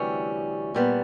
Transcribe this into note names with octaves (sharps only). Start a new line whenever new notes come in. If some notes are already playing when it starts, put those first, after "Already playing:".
Already playing: D2 C3 E3 G3 C#4
A#2 G3 B3